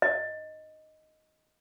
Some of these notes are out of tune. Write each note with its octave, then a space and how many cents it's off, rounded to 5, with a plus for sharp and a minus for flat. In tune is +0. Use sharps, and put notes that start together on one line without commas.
D#5 +0